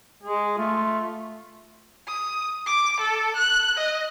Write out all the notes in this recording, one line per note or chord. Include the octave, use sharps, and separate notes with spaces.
G#3 G#4
A3 F4
D#6
D6
A4
F#6
D#5